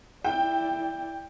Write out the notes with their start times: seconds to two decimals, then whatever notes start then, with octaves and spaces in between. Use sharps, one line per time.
0.24 E4 D5 G5